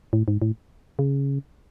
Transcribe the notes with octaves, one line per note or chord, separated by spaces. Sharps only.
A2
G#2
A2
C#3